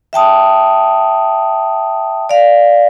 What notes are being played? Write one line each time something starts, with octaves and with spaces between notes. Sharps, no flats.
E5 G5 A5 D#6
D5 F5